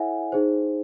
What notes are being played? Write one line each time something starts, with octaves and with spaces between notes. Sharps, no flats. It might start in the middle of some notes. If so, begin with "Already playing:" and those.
Already playing: E4 A4 C#5 E5 F#5 G#5
D#4 G#4 C5